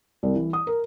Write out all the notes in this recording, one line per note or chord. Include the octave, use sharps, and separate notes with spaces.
C2
E3
D#6
A#4